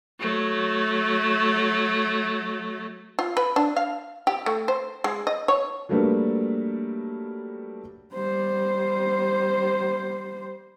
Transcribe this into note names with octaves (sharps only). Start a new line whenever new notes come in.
F#3 A3
F4
B4
D4
F5
G4
A3
C5
G#3
D#5
C#5
F#3 G3 A3 A#3 D4 B4
G3 C5